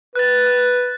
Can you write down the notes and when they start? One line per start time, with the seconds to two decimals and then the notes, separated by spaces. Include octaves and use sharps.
0.15 B4 F#6 A6
0.46 F#6